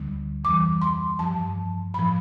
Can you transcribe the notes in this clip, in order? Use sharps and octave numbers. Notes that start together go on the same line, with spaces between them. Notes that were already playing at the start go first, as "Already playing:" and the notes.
Already playing: D2 D3 G3
F2 E3 G3 D6
C6
G2 F3 A5
A2 B5
F3